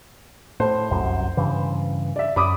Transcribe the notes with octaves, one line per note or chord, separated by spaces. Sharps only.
A2 C5
F1 C2 F#2
G2 C#3 E3
D5 E5
F#2 B5 D6 D#6